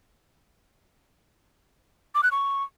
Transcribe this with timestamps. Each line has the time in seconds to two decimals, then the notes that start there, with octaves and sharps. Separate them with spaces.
2.15 D6
2.23 F#6
2.32 C#6